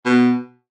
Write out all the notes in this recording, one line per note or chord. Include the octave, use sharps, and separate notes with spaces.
B2